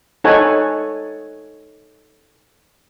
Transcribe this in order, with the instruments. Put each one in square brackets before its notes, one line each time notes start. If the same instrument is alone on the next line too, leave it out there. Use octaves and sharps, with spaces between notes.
[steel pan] D#4 A4 C#5 F#5 G#5